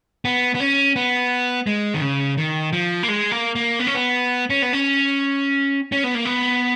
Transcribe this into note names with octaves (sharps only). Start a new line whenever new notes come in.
B3
B3
C#4
B3
G#3
D#3
C#3
D#3
F3
A#3
G#3
A#3
A#3
B3
C#4
B3
C#4
B3
C#4
C#4
B3
A#3
B3